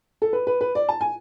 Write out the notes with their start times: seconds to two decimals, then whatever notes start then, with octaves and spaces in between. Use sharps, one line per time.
0.22 A4
0.33 B4
0.47 B4
0.61 B4
0.75 D5
0.89 A5
1.01 G#5